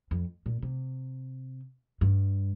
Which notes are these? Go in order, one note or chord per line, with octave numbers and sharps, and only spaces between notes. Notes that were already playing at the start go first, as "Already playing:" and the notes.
F2
A#2
C3
G2